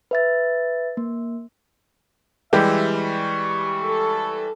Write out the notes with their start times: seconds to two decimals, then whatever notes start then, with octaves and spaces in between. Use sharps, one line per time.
0.11 B4 E5 A6
0.97 A#3
2.53 E3 G3 G#3 G4 E5
3.01 C#6
3.83 A4